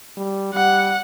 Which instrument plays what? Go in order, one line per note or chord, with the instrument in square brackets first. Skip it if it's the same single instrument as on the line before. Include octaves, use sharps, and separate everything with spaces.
[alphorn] G3
[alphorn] G3 [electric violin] F#5